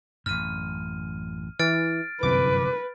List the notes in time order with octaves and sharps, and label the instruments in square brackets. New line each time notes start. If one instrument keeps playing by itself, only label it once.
[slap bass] A1 F#2 [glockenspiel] F6 D#7
[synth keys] E3 [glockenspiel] F6 A6 D7
[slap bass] G1 F#2 E3 [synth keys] C2 D6 [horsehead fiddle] B4